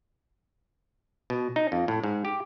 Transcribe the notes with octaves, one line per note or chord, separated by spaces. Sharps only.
B2
D#4
F2
A2
G#2
G4